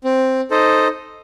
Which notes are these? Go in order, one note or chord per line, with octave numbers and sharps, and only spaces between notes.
C4
D#4 A4 C5 D#5